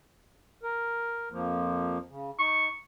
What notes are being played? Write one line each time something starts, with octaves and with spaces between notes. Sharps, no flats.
A#4
F2 F3 A#3
C#3
D#4 C#6